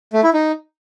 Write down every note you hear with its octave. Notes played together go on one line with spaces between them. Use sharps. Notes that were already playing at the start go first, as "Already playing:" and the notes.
A3
E4
D#4